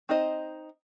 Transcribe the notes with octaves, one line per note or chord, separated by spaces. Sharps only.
C4 D#4 C5 D#5